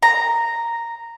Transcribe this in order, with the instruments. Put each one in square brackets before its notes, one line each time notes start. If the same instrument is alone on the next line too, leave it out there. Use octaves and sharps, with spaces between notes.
[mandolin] A#5